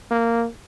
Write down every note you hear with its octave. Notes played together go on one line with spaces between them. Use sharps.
A#3